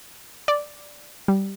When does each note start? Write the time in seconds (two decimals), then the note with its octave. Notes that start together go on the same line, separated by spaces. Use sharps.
0.48 D5
1.28 G3